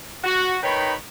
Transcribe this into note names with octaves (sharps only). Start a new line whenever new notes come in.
F#4
D#3 D#4 B4 C#5 G5 B5